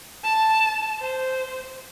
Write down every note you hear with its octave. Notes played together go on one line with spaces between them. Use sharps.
A5
C5